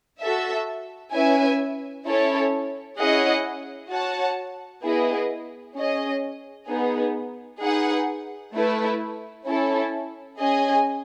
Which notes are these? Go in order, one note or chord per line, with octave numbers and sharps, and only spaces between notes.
F#4 A4 E5
C#4 E4 B4 E5 G#5
C#4 E4 A4 C#5
C#4 E4 G#4 D#5 F#5
F#4 C#5 F#5 A5
B3 E4 G#4 B4 D#5
C#4 G#4 D#5
B3 D#4 G#4
D#4 G#4 B4 F#5
A3 E4 B4
C#4 E4 A4
C#4 G#4 D#5 G#5